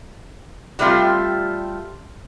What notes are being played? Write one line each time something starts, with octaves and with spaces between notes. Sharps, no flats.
F#3 G3 A3 C4 F4 G4